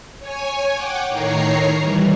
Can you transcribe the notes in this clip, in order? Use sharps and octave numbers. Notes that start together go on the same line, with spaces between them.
C#5 G#5
F#5 G5 D6
A2 D#3 C#5 A#5 C7
E3 G3